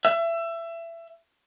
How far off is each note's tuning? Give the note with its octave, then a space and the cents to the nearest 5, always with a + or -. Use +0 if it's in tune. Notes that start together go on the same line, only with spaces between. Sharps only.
E5 +25